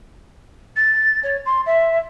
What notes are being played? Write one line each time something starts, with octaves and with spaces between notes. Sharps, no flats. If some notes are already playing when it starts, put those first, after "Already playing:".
A6
C#5
C6
E5